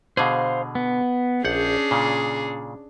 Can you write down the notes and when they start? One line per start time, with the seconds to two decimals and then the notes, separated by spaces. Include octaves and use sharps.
0.17 B2 D3 G#4 C5 F5
0.75 B3
1.45 A#1 C#4 D4 G#4 F#5 G6
1.91 A#2 C#3